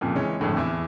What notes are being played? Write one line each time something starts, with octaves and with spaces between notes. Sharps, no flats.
F2 A#2 C#3
E3 G#3 C#4
G#1 F2 A2 D3
E2 E4 E5